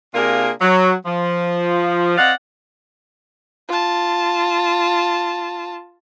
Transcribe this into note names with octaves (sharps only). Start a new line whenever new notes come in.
C3 A#3 D4 F4 G#4 A#4
F#3
F3
C4 D5 D#5 F5 F#5
F4 A5